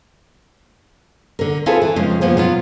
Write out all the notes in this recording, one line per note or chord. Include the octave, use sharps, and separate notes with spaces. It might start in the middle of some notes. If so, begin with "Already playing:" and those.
D3 A#4
C4 E4 F4 G#4 A4 B4
E3
F2 C#3 G#3
C#3 F3 A#3 B3
B2 F#3 F4